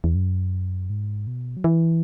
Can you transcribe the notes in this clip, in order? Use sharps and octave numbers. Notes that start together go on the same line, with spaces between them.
E2
F#2
G#2
B2
F#3
E3